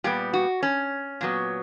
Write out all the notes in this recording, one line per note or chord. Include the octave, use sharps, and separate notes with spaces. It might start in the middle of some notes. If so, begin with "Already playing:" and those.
A#2 G3 B3 G4
F#4
C#4
A#2 F#3 B3